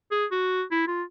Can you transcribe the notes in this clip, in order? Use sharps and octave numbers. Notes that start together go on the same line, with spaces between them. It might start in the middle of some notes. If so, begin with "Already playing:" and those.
G#4
F#4
E4
F4